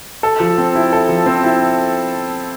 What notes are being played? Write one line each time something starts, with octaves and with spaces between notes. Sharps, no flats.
A4
F3
C4
E4
A4
F3
C4
E4